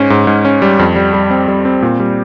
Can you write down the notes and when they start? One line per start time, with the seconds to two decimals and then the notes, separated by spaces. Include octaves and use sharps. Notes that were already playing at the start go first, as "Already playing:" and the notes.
Already playing: G#2 C#4
0.10 G#2
0.27 G#2
0.45 C#4
0.62 G3
0.79 F2
0.96 G3
1.14 G3
1.30 C4
1.48 G3
1.65 C4
1.82 A#2
2.00 G3